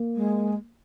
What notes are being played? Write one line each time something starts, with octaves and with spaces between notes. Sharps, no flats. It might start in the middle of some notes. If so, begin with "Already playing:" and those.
Already playing: A#3
G#3